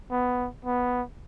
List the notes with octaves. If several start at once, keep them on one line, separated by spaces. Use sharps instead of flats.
B3
B3